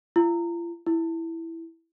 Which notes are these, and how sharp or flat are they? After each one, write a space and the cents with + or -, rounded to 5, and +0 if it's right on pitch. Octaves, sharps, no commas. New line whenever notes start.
F4 -45
E4 +0